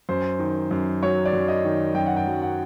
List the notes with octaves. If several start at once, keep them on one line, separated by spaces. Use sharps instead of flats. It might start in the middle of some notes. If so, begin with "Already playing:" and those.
F#2 C5
D#3
F#2
F#3 C#5
D5
F#2
D#5
D#3
F#2 G5
F#5
G5
F#3
F#5